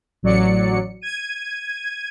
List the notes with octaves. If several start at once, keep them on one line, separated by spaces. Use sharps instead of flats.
A1 F#3 D5 C#7
G#6 D#7